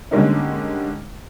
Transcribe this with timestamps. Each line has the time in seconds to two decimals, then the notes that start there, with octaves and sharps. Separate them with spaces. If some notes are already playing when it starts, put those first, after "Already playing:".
0.11 D3 G3 G#3 A#3 C#4 D#4